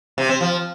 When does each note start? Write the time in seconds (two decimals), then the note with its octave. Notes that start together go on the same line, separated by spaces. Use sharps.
0.18 C3
0.29 C4
0.41 F3